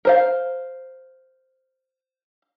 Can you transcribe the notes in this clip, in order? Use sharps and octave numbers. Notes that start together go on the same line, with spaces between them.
A#4 C5 F5